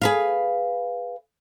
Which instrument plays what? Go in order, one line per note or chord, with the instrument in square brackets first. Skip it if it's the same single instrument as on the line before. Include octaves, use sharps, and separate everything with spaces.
[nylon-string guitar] G#4 B4 F5